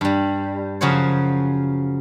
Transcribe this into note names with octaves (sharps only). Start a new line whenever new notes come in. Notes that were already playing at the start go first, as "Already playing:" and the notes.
G2 G3
F#2 C#3 F3 F#4 C5 C#5